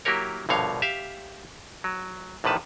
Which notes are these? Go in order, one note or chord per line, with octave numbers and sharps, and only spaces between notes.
F#3 A#3 E4 G4 A#4 C#5
A#1 G2 B2 D3 C#5 F5
G4 E5 F5
F#3
A#1 A2 D3 D#3 B4 A5